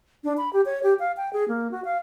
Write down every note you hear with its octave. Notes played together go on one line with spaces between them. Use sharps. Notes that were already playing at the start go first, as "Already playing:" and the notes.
D4
B5
G4
C#5
G4
F5
G5
G#4
A#3
F#4
F5